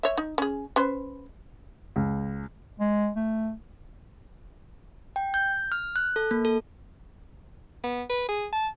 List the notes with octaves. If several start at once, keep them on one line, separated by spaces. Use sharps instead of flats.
C#5 E5
D#4
C#4 G#4
C#4 B4 C5
C#2
G#3
A3
G5
G6
F6
F#6
A4
A#3
A4
B3
B4
G#4
A5